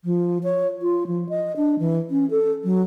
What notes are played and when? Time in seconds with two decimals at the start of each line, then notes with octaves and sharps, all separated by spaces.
0.05 F3
0.43 C#5
0.82 F4
1.07 F3
1.29 D#5
1.57 D4
1.79 E3
2.11 C#4
2.30 A4
2.64 F#3